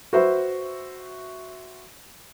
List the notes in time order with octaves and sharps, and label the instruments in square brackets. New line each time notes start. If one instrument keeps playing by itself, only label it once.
[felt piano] F#4 B4 C5 E5